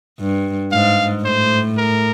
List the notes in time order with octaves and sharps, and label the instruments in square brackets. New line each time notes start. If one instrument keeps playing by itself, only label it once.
[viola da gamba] G2
[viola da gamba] G#2 [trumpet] F5
[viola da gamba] A2 [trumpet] C5
[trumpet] A#4